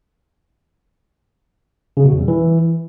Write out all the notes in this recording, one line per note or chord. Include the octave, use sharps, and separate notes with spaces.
C#3
B2
E2
G3
E3